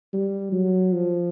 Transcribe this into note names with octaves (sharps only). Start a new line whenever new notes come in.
G3
F#3
F3